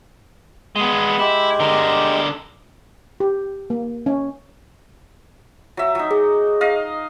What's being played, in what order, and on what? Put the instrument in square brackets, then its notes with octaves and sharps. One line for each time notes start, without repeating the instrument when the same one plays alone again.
[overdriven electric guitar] G#3 B3
[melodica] G#3 G4 [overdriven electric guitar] E4
[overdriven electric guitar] D3 A#4
[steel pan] G4
A#3
C#4
[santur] F#3 E5
F#3 D#4
[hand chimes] G#4
[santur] D#5 F5